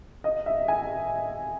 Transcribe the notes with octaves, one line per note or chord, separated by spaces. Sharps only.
D#5
E5
G#5